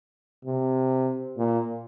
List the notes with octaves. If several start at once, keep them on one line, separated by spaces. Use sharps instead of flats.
C3
A#2